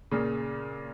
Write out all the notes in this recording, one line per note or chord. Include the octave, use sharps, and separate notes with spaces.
A#2 C#3